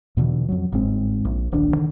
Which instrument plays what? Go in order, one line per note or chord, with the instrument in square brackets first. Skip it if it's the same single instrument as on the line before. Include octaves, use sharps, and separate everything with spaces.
[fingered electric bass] E2 B2 D3 E3
F2 F#3
G1 G#2 G#3 C4
A#1
D1 A#1 D#3 D4
D3 D#3